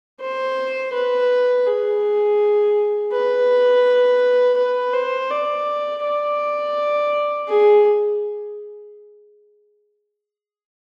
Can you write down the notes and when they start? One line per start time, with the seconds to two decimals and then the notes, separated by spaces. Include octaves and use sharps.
0.21 C5
0.93 B4
1.66 G#4
3.12 B4
4.57 B4
4.94 C5
5.31 D5
6.03 D5
7.48 G#4